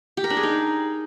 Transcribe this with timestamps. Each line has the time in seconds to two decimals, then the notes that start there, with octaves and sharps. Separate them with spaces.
0.17 G4
0.24 A#4
0.30 D4
0.37 G#4
0.43 D#4